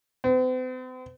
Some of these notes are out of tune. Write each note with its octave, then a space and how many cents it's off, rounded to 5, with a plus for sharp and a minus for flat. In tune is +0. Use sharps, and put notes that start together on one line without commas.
C4 -45